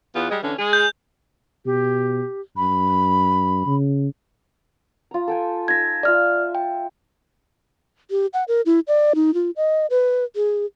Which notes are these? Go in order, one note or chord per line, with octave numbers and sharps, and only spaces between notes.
E2 B3 F4
G3 G#3
D3 E3 C#4
G#3 G#4
G6
B2 G4
F#2 B5
C#3
F4 A#5
A4 G5 G#5
D#4 G#5 E6 G#6 A#6
F4 D5 E5 F5 F6
G5
G4
F#5
A#4
E4
D5
D#4
F4
D#5
B4
G#4